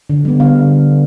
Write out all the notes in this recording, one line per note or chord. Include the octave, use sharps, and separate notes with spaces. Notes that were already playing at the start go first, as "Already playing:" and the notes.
D3
G3 B3
D3 F5